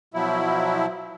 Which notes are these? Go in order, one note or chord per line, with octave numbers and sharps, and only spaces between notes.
B2 F3 F#3 E4